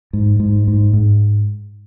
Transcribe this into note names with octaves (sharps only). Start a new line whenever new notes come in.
G#2
G#2
G#2
G#2